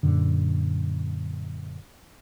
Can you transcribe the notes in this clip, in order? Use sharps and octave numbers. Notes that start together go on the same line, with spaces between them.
F#2 A#2 D3